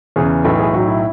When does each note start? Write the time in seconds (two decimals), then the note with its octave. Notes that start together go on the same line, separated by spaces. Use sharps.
0.16 E2 C#3 E3 G#4
0.44 B1 A2 E3 A4
0.59 G#4
0.73 B1 A2 F#3 F#4
0.88 E4